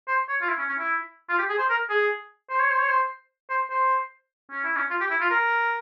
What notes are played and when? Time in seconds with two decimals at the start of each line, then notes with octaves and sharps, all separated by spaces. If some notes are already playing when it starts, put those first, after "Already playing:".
0.08 C5
0.29 C#5
0.42 F4
0.49 E4
0.59 C#4
0.69 C#4
0.79 E4
1.29 F4
1.39 G4
1.49 G#4
1.59 C5
1.70 A#4
1.90 G#4
2.50 C5
2.60 C#5
2.70 C5
2.79 C#5
2.89 C5
3.50 C5
3.70 C5
4.51 C#4
4.64 E4
4.76 C#4
4.90 F4
5.01 G4
5.11 E4
5.21 F4
5.31 A#4